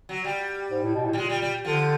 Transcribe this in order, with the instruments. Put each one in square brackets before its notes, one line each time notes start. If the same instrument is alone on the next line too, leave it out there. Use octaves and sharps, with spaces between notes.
[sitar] F#3
G3
[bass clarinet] G#2
A2
B2
A2
[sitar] G3
[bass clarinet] A#2 [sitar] G#3
[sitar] G3
G3
[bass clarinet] D3 [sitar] F3